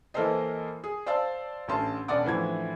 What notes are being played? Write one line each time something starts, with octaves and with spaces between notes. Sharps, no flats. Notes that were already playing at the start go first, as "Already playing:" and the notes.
E3 A#3 A4 A#4 C5 D#5
G#4
C5 D5 F5 A5 E6
A1 D3 C#4 A5 C6
E1 C#4 D4 D5 F#5 D6
A2 D3 E3 F3 G#6